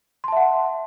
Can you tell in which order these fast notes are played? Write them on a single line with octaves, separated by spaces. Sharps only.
C6 A5 E5 F#5